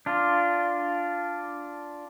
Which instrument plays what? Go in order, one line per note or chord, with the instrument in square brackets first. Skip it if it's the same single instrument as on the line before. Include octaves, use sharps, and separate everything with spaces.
[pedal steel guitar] D4 F4